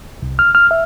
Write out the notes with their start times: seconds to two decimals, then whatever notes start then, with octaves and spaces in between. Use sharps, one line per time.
0.22 C2
0.39 F6
0.55 F6
0.71 E5